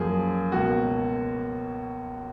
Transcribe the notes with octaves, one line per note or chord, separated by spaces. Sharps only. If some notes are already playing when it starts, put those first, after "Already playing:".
Already playing: F#2 F3 A#3 G#4
C#2 B2 A#3 F#4